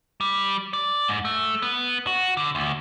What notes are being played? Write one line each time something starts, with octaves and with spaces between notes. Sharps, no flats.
G3
D5
G#2
A3
B3
F#4
D3
D2